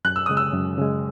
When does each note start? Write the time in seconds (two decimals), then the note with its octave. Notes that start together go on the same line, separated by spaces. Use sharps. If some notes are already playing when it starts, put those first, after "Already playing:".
0.05 F#2 F#6
0.16 E6
0.26 C#3 G#3 D#6
0.37 E6
0.53 F#2
0.77 C#3 G#3